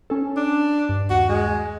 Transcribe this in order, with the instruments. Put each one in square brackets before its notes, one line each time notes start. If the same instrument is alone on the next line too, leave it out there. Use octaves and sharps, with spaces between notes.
[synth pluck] C#4 A4
[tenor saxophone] D4
[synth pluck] G2
[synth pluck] D#2 [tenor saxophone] F#4
[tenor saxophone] G#3